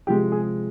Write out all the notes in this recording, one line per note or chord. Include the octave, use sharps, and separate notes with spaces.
C3 F3 G#3 G4
G#4